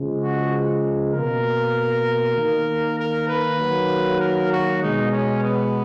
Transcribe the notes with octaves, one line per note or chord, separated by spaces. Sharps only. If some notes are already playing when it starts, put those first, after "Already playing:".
Already playing: C#3 F3 G#3
F#4
B2 A#3 A#4
D#3 A#3
A#4
B4
D#3 F#3 A#3
A#4
F#4
B2 G#3 D#4
C#4
B3